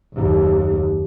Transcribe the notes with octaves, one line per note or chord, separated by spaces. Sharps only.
F#1 D#2